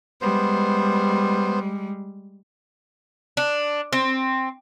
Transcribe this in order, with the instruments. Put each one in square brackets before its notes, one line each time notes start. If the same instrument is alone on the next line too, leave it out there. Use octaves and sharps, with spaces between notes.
[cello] G3 G#3 [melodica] B3 C5
[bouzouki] D4
C4